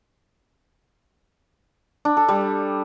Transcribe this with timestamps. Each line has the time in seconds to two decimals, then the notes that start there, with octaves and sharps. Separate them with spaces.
2.05 D4
2.17 A4
2.29 G3